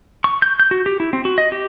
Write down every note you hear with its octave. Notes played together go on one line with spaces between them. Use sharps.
C#6
G6
G6
F#4
G4
E4
C4
F#4
D#5
G4